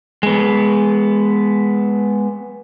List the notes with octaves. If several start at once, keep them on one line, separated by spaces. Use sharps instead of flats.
G#3 B3